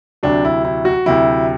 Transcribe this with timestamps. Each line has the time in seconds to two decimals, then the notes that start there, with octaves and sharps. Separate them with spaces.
0.23 D2 C3 F#3 D4
0.45 E4
0.65 E4
0.85 F#4
1.06 D2 C3 F#3 E4